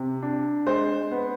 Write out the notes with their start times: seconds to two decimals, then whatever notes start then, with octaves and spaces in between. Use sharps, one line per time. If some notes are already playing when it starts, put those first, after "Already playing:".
Already playing: C3
0.22 D4
0.67 G#3 C5
1.11 B3